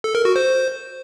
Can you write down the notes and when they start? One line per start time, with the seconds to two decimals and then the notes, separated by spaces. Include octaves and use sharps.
0.04 A4
0.15 A#4
0.25 F#4
0.36 C5